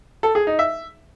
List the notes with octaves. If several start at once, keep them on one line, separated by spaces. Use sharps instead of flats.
A4
G#4
D#4
E5